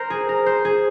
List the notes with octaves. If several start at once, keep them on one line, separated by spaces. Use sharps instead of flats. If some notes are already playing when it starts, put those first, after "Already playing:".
Already playing: A#4 C5
G#4
A#4
C5
G#4